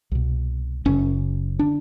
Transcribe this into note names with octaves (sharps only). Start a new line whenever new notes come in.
C2 B2
F#1 F#2 C#3 C#4
D3 D4